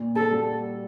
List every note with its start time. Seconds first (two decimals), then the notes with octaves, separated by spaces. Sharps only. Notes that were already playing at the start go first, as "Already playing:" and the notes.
Already playing: A#2
0.16 A4
0.31 G3 A#3 F#4 A4